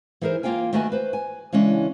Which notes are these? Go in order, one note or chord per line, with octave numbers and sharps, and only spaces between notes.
E3 D#4 G#4 A#4 C5
A#3 F4 F5 G5 G#5
D#3 A3 B3 F#4 B4 G#5
B4 C5
G#5
C#3 E3 G#3 C#4 D4